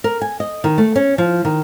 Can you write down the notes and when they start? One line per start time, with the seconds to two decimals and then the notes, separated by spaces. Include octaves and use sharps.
0.04 A#4
0.22 G#5
0.40 D#5
0.64 D#3
0.78 A3
0.96 C#4
1.18 F3
1.45 D#3